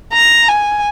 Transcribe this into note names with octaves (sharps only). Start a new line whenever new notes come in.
A#5
G#5